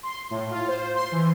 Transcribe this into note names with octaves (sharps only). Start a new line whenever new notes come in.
C6
A2
F4
C5
C6
E3